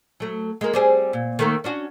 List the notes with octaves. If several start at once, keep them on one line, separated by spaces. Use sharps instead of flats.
F#3 A3
G#3 A#3
G3 C4 G#4
A#2
D#3 A3 A#3
C#4 D4 F#4